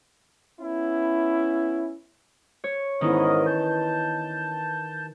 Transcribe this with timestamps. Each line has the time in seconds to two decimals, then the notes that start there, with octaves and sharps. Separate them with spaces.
0.61 B3 C#4 E4
2.64 C#5
3.01 G#2 D#3 E3 B3 C#4 A#4 D#5
3.46 A5 G6